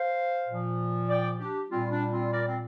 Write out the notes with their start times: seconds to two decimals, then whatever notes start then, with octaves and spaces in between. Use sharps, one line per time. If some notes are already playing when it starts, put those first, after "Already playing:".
Already playing: C5 F5
0.48 A#2 F3
1.09 D5 G5
1.39 D4 G4
1.70 A#2 G3 C4 F4
1.90 D4
2.11 C4 F4
2.31 A#4 D5
2.47 C4